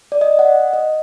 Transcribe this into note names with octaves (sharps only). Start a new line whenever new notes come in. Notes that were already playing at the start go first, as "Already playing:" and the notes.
D5
D#5
F#5
D#5